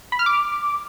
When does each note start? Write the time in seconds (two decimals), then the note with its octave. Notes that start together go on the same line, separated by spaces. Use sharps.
0.12 B5
0.19 F6
0.26 D6